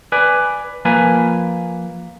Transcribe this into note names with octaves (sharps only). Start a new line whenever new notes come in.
B4 D5 G#5
F3 A#3 B4 G#5